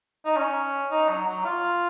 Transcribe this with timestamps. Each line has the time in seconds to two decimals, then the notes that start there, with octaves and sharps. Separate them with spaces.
0.25 D#4
0.37 C#4
0.91 D#4
1.09 F#3
1.27 F#3
1.45 F4